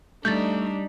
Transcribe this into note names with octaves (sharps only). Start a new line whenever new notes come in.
G3 A3 D4 D#4 G6 A6